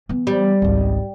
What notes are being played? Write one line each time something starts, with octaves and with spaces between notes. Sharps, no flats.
E3 B3
G3
G#1 C#2